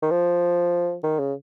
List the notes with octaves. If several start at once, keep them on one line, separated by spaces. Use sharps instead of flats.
D#3
F3
D#3
C#3